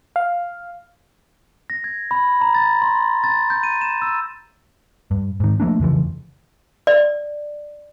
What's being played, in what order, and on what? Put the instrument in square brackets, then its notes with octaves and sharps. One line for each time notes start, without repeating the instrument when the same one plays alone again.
[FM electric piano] F5
[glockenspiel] A#6
G#6
B5
A#5
A6
C6
A6
G6
D#7
E7
E6
[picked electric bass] G2
G#2 D#3
F3 A3 A#3 D4
F2 C#3 E3 F3
[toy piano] D5